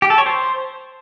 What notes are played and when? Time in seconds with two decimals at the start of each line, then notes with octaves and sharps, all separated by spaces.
0.02 G4
0.10 A4
0.18 C#5
0.26 C5